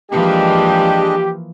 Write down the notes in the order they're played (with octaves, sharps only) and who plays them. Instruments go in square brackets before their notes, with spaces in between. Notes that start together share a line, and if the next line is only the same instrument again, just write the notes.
[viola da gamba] E3 F3 A#3 [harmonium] G#3 D4 D#5 [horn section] G4